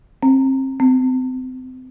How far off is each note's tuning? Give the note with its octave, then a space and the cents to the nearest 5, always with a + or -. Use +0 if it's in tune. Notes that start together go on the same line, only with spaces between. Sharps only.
C4 +30
C4 -35